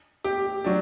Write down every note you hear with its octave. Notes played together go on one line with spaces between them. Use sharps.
G4
F#3 D4